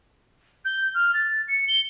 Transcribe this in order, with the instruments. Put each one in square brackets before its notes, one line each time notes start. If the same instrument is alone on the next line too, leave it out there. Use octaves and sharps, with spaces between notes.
[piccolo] G6
F6
A6
C#7
G7